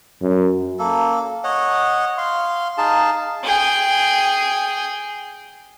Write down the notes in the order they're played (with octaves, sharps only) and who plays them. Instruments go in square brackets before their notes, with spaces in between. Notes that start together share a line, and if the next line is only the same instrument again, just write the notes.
[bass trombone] F#2
[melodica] A#3 A4
C#5 D#5 F#5
F5 C6
D#4 G#4 F5 A5
[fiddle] G#4 G5